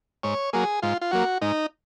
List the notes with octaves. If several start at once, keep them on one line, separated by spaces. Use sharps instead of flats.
G#2 C#5
F#3 A#3 G#4
G#2 F4
F4
F#3 A#3 F#4
G#2 D#4